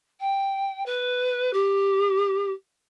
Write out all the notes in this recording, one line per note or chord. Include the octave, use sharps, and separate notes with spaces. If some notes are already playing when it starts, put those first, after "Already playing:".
G5
B4
G4